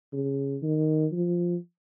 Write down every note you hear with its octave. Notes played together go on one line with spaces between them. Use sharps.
C#3
D#3
F3